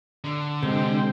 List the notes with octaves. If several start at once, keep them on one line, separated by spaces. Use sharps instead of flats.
D3
C3 G#3 C4 C5 G5